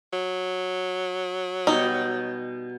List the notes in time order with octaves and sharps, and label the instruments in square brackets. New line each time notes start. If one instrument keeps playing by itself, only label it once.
[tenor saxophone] F#3
[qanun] B2 G3 C#6 [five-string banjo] D#4